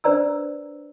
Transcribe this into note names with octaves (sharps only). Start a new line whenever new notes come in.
D4 B4 C5 D5 A#5 E6